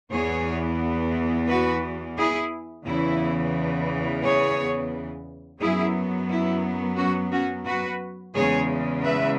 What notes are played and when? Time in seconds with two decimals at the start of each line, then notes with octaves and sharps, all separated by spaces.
0.11 E2 E3 B3 G#4 C#5
1.48 F#4 B4
2.17 E4 G#4
2.85 E2 C#3 E3 B3 E4
4.23 G#4 C#5
5.60 F#2 F#3 B3 E4 G#4
6.29 E4
6.97 C#4 F#4
7.31 C#4 F#4
7.66 F#4 B4
8.34 E2 C#3 G#3 G#4 C#5
9.03 B4 E5